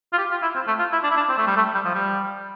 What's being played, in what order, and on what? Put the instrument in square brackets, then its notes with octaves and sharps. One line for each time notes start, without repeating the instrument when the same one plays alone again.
[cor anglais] F4
G4
F4
E4
C4
A3
F4
E4
D4
E4
D4
C4
A3
G3
A3
G3
F3
G3